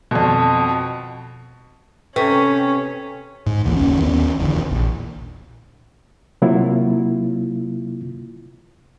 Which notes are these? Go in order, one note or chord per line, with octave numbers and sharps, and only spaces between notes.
F2 B2
C3 C#4 A4 B4 C#6 B6
G#2
A1 D2 E3 A#3
F#1 D#2 C#4
D#2 B3 C#4
E1 E2 D3
A#1
C3 F#3 A#3 E4 F4